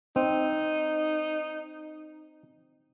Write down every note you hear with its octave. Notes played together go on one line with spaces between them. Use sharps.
C4 D#4